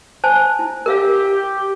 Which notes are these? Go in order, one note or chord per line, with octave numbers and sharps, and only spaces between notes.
C5 G#5 A5
E4
G4 A#4 E5 F5